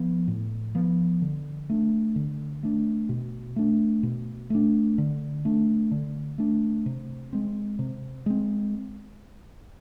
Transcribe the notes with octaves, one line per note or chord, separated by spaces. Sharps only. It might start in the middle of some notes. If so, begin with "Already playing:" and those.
Already playing: F3 B3
A2
F3 B3
D3
A3 D4
D3
A3 D4
B2
A3 D4
B2
A3 D4
D3
A3 D4
D3
A3 D4
C3
G#3 C4
C3
G#3 C4